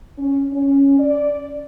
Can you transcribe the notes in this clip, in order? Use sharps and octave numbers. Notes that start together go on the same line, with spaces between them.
C#4
C#4
D5